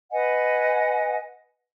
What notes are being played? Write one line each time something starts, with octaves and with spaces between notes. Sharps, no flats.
B4 D#5 F#5 G#5